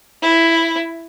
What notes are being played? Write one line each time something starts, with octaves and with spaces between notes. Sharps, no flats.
E4